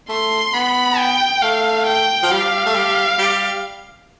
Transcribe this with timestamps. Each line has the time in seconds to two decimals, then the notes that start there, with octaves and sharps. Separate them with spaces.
0.09 A3 C6
0.54 B3 B5
0.98 G5
1.42 A3 F5
1.87 G5
2.23 F3
2.31 G3 F5
2.66 A3
2.74 G3
3.19 G3